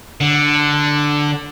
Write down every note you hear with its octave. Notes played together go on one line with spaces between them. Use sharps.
D3